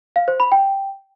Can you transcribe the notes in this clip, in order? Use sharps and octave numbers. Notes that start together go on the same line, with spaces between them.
F5
C5
B5
G5